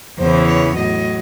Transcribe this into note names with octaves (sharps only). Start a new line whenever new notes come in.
E2 C#3 E3 C5
C#5
A2 F#3 D#5